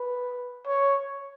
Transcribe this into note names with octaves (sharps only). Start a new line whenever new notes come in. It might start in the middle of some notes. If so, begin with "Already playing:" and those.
Already playing: B4
C#5